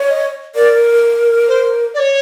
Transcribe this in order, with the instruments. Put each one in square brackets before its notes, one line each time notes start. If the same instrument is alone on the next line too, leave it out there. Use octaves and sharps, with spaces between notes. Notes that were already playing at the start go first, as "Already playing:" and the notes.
Already playing: [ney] C#5
[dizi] D#5
[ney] A#4 [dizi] D5
[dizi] C5
D5
C#5